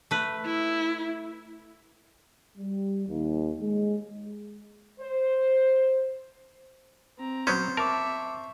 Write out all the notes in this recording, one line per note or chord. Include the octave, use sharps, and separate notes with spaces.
A3 B4
E4
G3
D#2
G#3
C5
C4 A#5
F#3 B3 C#4 C5
A#4 E5 A5 C#6 D6